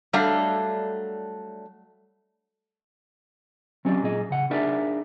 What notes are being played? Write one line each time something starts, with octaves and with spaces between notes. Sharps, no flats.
F#3 G3 A3 D4 F5 F#5
F#3 C4 C#4 G4 D5 D#5
A#2 G#4 D#5
C#3 F#5
D4 D#4 G#4 A#4 D5 E5